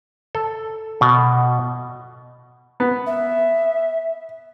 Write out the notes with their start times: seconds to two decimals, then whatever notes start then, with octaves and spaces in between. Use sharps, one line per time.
0.35 A4
1.01 B2
2.80 B3
3.06 E5